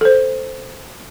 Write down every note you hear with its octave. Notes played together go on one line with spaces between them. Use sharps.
A4 C5